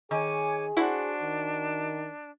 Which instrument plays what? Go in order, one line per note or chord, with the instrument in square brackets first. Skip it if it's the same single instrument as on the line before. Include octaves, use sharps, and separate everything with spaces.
[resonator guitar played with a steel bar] D#3 [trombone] G#4 [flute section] C#5 G#5 D6
[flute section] D4 [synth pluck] E4 [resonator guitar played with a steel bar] F#4 C5 F#5
[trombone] D#3